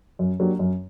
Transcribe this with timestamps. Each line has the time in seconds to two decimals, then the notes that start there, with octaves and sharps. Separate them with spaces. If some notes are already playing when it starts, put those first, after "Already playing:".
0.19 F#2
0.40 F#3 A#3 D4 G4
0.59 F#2